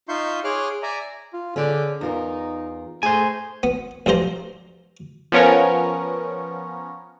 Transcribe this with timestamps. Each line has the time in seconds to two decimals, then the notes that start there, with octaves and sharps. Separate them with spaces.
0.09 D#4 F4 E5 C6 C#6 G6
0.44 G#4 C#5 C6 D6 F6 F#6
0.82 D5 E5 G#5 A#5
1.33 F4
1.56 D3 C#4 G#4 D5
2.01 E2 D#4 F4 A#4
3.03 A3 G#4 A4 C5 E5 G#5
3.63 B3
4.06 B1 G2 F3 C5 A#5
5.32 F3 B3 C#4 A#4 C#5